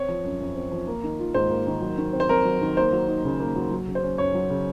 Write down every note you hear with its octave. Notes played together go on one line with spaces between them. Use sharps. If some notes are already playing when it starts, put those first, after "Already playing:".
Already playing: C4 C#5
F3
F#2
F#2
C4
F3
A#3
D#3
F4
G#2 C5
A#3
D#3
F#3
D#3
C4
C5
F2 A#4
F#3
D#3
A#3 C5
F#3
D#4
C#3
A#3
F#3
F#3
C#3
C5
C#4
F#2 C#5
F#3
C#3